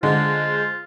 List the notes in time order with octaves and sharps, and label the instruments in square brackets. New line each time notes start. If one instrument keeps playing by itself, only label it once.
[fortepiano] D3 [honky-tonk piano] G#3 [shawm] F4 [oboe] C5